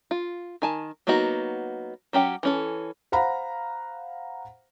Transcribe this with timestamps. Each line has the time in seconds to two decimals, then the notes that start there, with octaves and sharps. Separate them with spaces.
0.11 F4
0.62 D#3 G#5 A5
1.07 F#3 A#3 B3 D#4 F#4
2.13 F#3 C#4 G4 F#5
2.43 E3 C#4 A4
3.12 C5 F5 F#5 A#5 B5